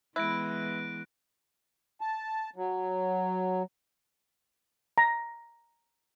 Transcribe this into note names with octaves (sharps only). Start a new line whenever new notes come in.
E3 G#3 B3 E4 F#6 A#6 D7
A5
F#3
A#5